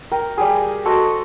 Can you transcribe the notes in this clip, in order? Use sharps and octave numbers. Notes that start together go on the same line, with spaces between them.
A#4 G5
G3 G4 G#4
F#4 A4 C5 D#5